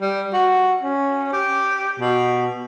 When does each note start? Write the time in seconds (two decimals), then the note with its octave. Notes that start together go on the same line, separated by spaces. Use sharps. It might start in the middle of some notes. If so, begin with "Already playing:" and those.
0.01 G3
0.33 F#4
0.83 C#4
1.33 G4
2.00 B2